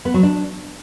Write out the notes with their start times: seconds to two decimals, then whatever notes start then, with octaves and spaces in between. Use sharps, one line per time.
0.05 B3
0.14 F#3
0.23 D4